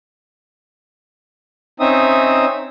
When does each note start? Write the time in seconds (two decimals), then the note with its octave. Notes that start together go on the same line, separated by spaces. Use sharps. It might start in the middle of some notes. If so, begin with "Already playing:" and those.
1.80 C4 C#4 D#4 E5 D#6